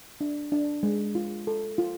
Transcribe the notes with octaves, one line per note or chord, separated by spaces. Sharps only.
D4
D4
G#3
F4
A4
F4